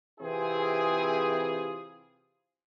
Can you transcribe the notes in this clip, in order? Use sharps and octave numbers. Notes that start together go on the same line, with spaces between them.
C3 E3 C4 E4 F4 G#4